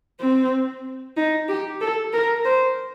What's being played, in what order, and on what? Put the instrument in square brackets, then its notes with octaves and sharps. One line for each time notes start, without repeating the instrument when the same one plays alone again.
[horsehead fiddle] C4
D#4
G4
A4
A#4
C5